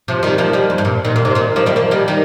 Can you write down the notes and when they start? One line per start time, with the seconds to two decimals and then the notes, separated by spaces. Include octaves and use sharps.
0.08 C3 F3
0.23 D#3 G3
0.38 F3 A#3
0.53 D#3 G3
0.70 F2
0.78 G2
0.85 A#2
1.05 A#2 D#3
1.16 A#2
1.25 C3
1.35 A#2 D#3
1.56 F3 A#3
1.66 D#3 G3
1.76 F3 A#3
1.91 D#3 G3
2.08 D#3 G3